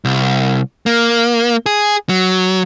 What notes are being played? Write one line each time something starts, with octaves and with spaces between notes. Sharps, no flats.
C2
A#3
G#4
F#3